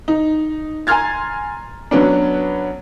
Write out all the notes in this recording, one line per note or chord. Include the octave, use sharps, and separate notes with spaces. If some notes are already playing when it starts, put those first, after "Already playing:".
D#4
G#5 A#5 C6 F6 G#6 A6
F#3 B3 C#4 D4